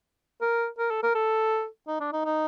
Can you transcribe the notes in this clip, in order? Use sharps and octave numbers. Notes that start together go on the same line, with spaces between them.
A#4
A#4
A4
A#4
A4
D#4
D4
D#4
D#4